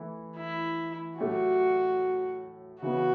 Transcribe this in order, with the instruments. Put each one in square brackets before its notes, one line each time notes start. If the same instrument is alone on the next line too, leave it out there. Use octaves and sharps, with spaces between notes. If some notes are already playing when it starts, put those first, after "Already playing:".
Already playing: [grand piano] E3 A3 E4
[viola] E4
[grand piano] A2 F#3 A3 C#4 G4 [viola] F#4
[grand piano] C#3 E3 B3 [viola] F#4